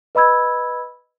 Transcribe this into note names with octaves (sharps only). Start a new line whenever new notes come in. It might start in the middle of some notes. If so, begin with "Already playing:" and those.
B4 D#5 B5 E6 G#6